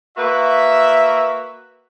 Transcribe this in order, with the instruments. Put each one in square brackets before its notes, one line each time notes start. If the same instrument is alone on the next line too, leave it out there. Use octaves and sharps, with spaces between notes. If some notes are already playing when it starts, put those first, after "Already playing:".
[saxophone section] A#3 F#4 B4 [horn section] E5